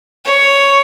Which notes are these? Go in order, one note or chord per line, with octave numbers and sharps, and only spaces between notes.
C#5